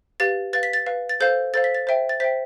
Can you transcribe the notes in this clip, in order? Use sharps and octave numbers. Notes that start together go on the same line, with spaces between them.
G4 B4 F5 A6
B4 F5 A6
B6
A6
B4 F5
A6
A4 C5 F5 G6
A4 C5 F5 A6
B6
A6
C5 E5 G5
A6
C5 E5 G5 B6